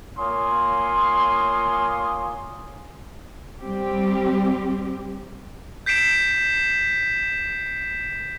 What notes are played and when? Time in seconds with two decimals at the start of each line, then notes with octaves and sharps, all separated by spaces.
0.18 A#3 F4 C#5 G#5 C6 D#6
3.60 G3 C4 G4
5.86 G6 B6 C7 D7 E7